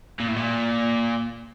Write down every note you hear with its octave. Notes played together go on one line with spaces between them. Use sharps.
A#2
A2
A#2